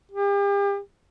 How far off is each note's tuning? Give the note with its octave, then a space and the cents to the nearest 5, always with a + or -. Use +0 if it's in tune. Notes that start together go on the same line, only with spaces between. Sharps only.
G4 +40